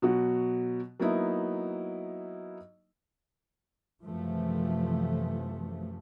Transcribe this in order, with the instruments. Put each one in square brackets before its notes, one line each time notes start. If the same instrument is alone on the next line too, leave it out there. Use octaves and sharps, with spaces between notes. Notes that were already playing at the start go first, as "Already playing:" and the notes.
[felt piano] B2 F#3 F#4
F#3 A#3 B3 D#4 E4
[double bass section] F#2 C3 E3 F3 A3